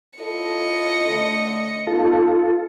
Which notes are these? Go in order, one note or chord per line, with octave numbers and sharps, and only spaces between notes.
E4 F4 A4 D#5 C#7
D3 A3
B3 D#4 F4 A4